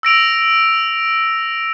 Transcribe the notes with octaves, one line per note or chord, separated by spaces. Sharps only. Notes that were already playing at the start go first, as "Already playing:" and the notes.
E6 A#6 D7 F7